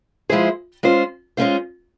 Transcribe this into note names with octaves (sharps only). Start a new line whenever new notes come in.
F3 G#3 E4 G#4 C5
G#3 C#4 F4 C5
G#3 C#4 F4 C5